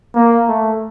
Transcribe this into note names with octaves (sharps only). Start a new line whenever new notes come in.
A#3
A3